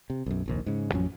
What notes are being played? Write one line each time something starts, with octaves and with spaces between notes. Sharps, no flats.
C3
B1 F#2
F1 A#1 D#2
G#2 C#3
A1 F2 F#3 C#4